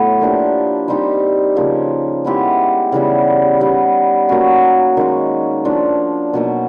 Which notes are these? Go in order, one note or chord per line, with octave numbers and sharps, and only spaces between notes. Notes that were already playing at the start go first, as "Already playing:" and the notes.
Already playing: A2 F#3 A3 B3 F#4
F3 A#3 D4 G4
G3 C4 D#4 G4
C#3 F3 A#3
G#3 B3 E4 G4
C#3 E3 G3 B3
G3 B3 D#4 G4
F#3 A#3 C#4 F#4
D#3 G#3 C#4
F3 A#3 D4
B2 F#3 A#3 D#4